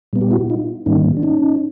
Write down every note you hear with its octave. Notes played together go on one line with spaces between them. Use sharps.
A#2 G3 B3
G4
E4 F#4
D#4 F4
G#2 D#3 G3 A#3 C#4 D#4
D4
C#4 D#4